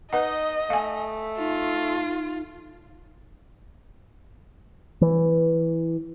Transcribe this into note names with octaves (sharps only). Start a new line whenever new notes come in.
D#4 B4 D#5 F#5
A3 F5 G#5
D#4 F4
E3